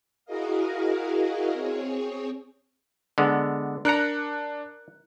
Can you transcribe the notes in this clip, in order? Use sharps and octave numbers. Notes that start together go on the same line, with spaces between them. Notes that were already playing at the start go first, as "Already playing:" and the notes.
E4 F#4 G#4 A#4 D#5 F5
C4 G#4 C#5
D3 G#3 B3
D4 A#4 A#5 F#6 C#7